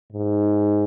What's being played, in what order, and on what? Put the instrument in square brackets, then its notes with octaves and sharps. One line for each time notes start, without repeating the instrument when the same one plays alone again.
[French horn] G#2